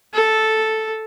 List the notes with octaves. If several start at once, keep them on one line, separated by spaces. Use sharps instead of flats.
A4